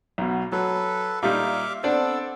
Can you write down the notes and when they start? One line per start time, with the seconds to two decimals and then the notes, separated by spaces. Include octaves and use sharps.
0.18 B1 B2
0.52 F#3 A4 B4
1.23 A#2 G3 D#4 E5 F5 D6
1.84 B3 C4 D4 A4 D5 E6